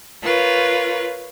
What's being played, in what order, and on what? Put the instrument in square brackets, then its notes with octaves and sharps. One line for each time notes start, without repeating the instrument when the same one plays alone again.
[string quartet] F4 A#4 B4 C#5